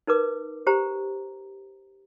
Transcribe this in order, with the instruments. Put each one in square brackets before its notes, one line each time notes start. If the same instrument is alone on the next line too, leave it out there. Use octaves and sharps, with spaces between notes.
[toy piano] D#4 A#4 B4 D6
G4 C5 A#5